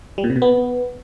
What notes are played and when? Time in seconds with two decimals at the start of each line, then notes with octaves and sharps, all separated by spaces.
0.18 G3
0.24 A#2
0.30 C3
0.36 B2
0.42 B3